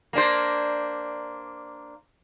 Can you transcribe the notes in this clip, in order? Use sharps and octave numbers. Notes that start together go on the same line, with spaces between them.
A#3 D4 C5